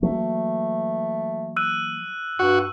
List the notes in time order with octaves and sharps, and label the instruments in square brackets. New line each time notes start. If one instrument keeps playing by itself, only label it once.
[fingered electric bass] E3 F#3 A#3 [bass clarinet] A3
[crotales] E6 F#6 D#7
[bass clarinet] G2 [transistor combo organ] F#4